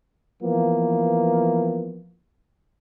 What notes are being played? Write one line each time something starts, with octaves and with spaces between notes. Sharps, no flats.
E3 F3 A#3 B3